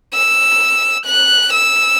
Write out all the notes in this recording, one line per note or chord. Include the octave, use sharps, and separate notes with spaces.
E6
F#6
E6